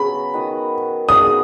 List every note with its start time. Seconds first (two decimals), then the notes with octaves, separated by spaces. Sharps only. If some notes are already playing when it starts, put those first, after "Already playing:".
Already playing: C#3 F#3 B3 F#4 B5
0.33 D#3 B3 F#4 D#5
1.08 C#3 B3 D#4 F#4 D#6